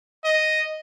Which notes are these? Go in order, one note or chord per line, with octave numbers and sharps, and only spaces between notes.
D#5